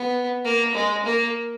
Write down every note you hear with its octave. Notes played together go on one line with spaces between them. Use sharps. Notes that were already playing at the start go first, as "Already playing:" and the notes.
Already playing: B3
A#3
G#3
A#3